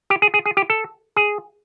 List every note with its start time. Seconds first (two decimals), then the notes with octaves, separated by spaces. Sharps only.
0.10 G4
0.22 G#4
0.34 G#4
0.46 G#4
0.57 G4
0.70 A4
1.16 G#4